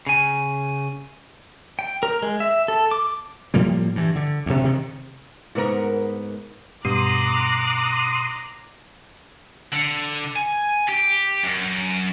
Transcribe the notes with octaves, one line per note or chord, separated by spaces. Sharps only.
C#3 G#5
G5
A#4
G#3
E5
A4
D6
A2 F3 G3 A#3
G2 E3
D3
D2 C3
C3 D#3
G#2 B3 A#4
G2 B2 A#5 C6 D6 D#6 F#6
D3
G#5
G4
F#2